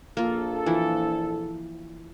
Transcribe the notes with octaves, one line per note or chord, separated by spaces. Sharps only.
A#1 A#3 F4 A4
E3 F3 E4